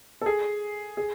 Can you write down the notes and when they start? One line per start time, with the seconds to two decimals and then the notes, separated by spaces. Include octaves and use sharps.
0.21 A4
0.26 G#4
0.97 G#4